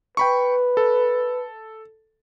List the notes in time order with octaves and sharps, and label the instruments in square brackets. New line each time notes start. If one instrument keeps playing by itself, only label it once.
[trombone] B4 [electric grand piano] G5 B5 C#6
[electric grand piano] A4